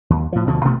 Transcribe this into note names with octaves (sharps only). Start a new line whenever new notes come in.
D#2
A2 F3
D2 B2 D3 F3
A1 B2 A3 B3